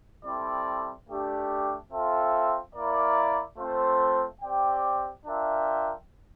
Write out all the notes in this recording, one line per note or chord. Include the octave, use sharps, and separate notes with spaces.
G3 C4 E4 A4 D5
A3 D4 G4
C4 F4 A4 E5
A#3 E4 A#4 D5
A3 C4 F4 C5
C4 G4 D5 G5
D4 F4 A#4 E5 G5